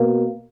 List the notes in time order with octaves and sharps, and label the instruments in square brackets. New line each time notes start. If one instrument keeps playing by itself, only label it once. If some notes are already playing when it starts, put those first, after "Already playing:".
Already playing: [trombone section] B2 A#3